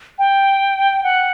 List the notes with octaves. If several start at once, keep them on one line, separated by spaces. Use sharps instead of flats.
G5
F#5